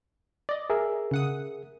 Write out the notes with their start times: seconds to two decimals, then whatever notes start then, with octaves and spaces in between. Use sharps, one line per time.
0.49 D5 D#5
0.70 G#4 A#4 E5
1.11 C#3 F#5 D#6